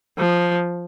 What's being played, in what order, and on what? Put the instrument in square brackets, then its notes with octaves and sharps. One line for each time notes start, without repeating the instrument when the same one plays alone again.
[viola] F3